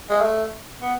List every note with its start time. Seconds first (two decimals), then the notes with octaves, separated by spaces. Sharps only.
0.09 G#3
0.21 A3
0.82 B3